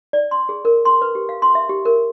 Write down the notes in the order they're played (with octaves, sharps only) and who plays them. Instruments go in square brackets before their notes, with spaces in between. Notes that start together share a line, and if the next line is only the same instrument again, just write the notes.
[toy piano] D5
C6
G#4
A#4
C6
B4
G4
F5
C6
E5
G4
A#4